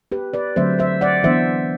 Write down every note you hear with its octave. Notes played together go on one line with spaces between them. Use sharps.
G4 B4
B4 D5
D3 F#3 A3 C4 C5 E5
C5 E5
D5 F#5
E3 B3 D4 C5 E5